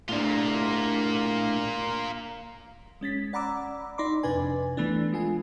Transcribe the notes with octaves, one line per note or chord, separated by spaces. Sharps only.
A2 A#3 D4 F4
G#3 C#4 A6 B6
D5 F#5 A#5 B5 D6 E6
D#4 D5 B5 C6 D6
F2 C3 D4 B4 G#5
E3 A3 B3 D4
G#3 F4 G#5